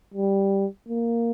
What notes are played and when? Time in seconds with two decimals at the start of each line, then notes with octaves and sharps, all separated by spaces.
0.14 G3
0.88 A#3